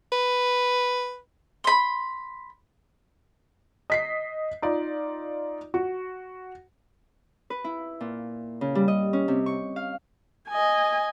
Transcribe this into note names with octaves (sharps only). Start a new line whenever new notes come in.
B4
B5 C6
D#5 B6 C7
D#4 F4 D5
F#4
B4
E4
A#2
C#3
G3
D#5
C#4
C3
C#6
F5
D#5 G#5